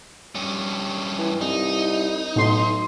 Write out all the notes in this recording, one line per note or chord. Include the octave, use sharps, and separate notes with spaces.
G2 C#4
E3
C2 D#4
B1 A2 C6